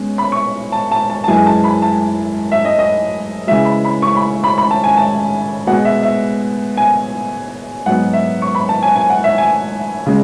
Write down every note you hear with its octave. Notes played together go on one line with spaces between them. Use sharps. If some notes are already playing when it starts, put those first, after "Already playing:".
Already playing: B2 G#3 C#4
B5
C#6
A5
A5
A5
A5
F#2 E3 G#3 G#5
A5
B5
A5
E5
D#5
D#5
C#3 E3 G#3 E5
B5
B5
C#6
B5
B5
B5
A5
G#5
A5
B2 G#3 B3 F#5
E5
E5
G#5
G#2 F#3 B3 F#5
E5
C#6
B5
A5
G#5
G#5
F#5
E5
G#5
C#3 G#3